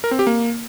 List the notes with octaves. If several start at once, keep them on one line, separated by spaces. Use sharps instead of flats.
A#4
C4
G4
A#3